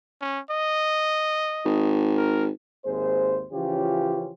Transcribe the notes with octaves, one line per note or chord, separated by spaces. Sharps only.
C#4
D#5
G#1
A#4
G#1 D#2 G#3 C5
C#3 E3 F3 C#4 F4 G4